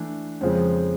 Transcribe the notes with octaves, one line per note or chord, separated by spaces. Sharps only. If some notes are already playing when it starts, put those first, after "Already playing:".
Already playing: E3 A3 D4
F2 C#3 F3 G#3 C4